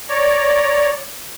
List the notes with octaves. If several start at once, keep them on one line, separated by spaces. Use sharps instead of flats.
C#5 D5 A#5